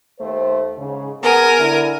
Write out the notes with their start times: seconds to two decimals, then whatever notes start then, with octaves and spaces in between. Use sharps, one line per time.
0.19 D#2 A3 C5
0.78 G#2 C#3
1.22 B3 G#4 A#4 G#5
1.59 D3 E4